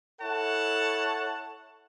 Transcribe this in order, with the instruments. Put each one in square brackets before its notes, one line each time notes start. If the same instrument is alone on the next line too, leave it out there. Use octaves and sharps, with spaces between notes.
[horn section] E4 A4 C#5 F#5 A5